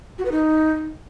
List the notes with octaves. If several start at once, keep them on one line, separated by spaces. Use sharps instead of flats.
F#4
B4
D#4